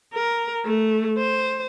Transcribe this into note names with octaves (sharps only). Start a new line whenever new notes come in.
A#4
A3
C5